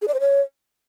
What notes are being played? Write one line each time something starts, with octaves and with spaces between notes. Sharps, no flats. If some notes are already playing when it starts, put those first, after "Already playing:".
G#4
D5
C5
C#5